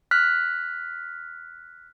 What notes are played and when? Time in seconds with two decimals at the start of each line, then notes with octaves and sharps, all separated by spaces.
0.11 F6 F#6 B6